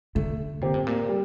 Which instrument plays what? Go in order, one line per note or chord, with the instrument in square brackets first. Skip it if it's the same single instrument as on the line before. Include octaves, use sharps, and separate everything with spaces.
[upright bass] D3 [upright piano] A3
[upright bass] A#2 [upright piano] C4 G4
[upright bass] A2
A#2
[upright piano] G3